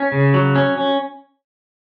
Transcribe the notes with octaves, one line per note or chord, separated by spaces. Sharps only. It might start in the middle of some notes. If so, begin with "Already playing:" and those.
Already playing: C#4
C#3
F#3
C#4
C#4